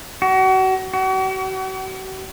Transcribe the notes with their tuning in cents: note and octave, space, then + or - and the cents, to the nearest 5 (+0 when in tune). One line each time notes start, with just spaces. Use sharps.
F#4 +35
F#4 +45